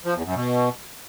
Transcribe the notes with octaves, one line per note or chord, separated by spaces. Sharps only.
F3
E2
F#2
B2